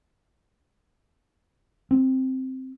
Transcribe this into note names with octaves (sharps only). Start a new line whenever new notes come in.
C4